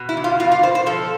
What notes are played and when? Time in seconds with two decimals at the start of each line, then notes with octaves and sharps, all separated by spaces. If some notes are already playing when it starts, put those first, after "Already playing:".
Already playing: B2
0.09 E4
0.17 E2
0.24 F4
0.40 E2 F4
0.52 F4
0.63 B2 C5
0.75 C5
0.86 F3 A4